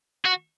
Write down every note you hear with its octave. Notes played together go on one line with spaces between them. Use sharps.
F#4